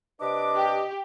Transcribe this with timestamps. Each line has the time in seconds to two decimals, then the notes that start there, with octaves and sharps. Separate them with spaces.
0.21 C3 D4 B4 D#5 D6
0.56 G4